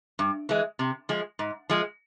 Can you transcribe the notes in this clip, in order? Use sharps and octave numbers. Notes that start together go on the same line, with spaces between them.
G2
E3 G#3
C3
F3 G#3
G#2
F3 G#3